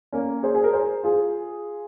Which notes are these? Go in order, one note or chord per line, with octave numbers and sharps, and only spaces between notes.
A#3 C#4
G#4 C5
G#4
A#4
G#4 C5
F4 G#4